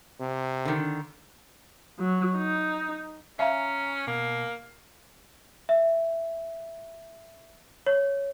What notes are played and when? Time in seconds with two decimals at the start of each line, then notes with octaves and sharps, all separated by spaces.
0.20 C3
0.65 D3 D#3
1.99 F#3
2.37 D#4
3.39 C#4 E5 F5 G#5 A#5
4.07 B2 A#3
5.69 E5
7.87 C#5